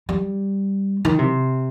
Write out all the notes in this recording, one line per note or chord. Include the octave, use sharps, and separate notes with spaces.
G3
D#3
C3